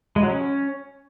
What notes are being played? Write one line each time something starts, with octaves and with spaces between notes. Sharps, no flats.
G#3
F#3
C#4